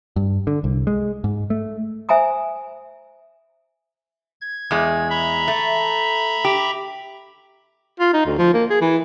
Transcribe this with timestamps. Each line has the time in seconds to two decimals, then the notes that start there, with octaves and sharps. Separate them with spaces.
0.16 G2
0.47 D3
0.64 C2
0.87 G#3
1.24 G#2
1.50 A3
2.09 C5 E5 G#5 A#5 D#6
4.41 G#6
4.71 E2 G#3
5.10 E5 A#5 B5
5.48 A3
6.45 G4
8.00 F4
8.14 D#4
8.26 D2
8.39 F3
8.54 A#3
8.70 G#4
8.81 E3